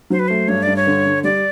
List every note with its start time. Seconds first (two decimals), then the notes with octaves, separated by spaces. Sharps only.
0.10 F#3 C5
0.19 B4
0.28 A3 C5
0.48 G2 C#5
0.63 G2 D5
0.76 C#5
0.87 D3
1.05 D3
1.24 G3 D5